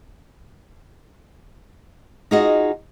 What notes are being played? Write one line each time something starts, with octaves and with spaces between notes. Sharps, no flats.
D#4 F4 F#4 G#4 D#5